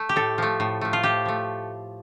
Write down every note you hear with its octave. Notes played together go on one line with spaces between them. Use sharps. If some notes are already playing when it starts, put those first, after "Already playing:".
Already playing: A3
G4
A2 A4
F3 A3
A2
F3 A3
F4
A2 G4
F3 A3